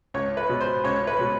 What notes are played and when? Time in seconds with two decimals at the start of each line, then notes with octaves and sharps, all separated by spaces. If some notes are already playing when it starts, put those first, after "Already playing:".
0.14 C#2 C#5
0.37 B4
0.49 B2 G#3
0.60 C5
0.84 C#2 C#5
1.07 B4
1.18 B2 G#3